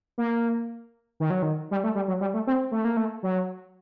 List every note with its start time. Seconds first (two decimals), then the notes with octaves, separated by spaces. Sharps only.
0.18 A#3
1.20 D#3
1.30 F#3
1.42 D#3
1.71 G3
1.84 A3
1.95 G3
2.08 F#3
2.21 G3
2.34 A3
2.47 C4
2.72 A3
2.85 A#3
2.97 A3
3.23 F#3